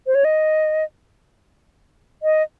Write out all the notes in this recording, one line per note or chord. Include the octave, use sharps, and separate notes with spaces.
C5
C#5
D#5
D#5